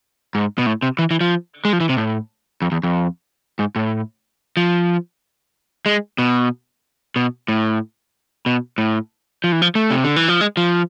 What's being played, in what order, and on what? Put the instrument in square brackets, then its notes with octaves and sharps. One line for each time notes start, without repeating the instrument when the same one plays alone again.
[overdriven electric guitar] G#2
B2
A2
C3
E3
E3
F3
G#3
F3
E3
C3
A2
F2
E2
F2
G#2
A2
F3
G#3
B2
B2
A2
B2
A2
F3
E3
F3
A3
C3
D3
E3
F3
G#3
F3